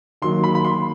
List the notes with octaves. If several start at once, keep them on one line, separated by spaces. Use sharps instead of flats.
D#3 F#3 A#3 C6
B5
B5
C6